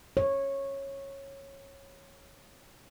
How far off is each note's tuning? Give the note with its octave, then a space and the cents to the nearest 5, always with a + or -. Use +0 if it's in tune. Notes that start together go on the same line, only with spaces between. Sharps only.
C#5 -15